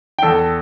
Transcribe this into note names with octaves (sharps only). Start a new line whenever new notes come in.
G5
E2 A4 A5